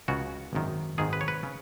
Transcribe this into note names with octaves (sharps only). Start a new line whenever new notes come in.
C#2 C#3 F#4
G#1 F#2 D#3
G#1 G#2 D#3 G#4
B4
C#5
B4
C#3